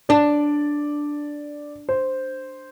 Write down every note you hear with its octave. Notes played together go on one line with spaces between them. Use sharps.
D4 D5
C5